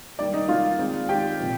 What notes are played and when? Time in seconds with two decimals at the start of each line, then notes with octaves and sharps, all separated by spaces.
0.19 D#3 G3 A#3 D5
0.33 D#4 D#5
0.48 D#3 G3 A#3 F4 F5
0.78 D#3 G#3 C4
1.09 D#3 G#3 C4 G4 G5
1.40 A#2 F3 C4